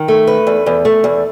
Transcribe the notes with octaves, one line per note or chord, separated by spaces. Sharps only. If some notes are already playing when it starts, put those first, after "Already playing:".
Already playing: D#3
A3
B4
E2
E2
A3
E2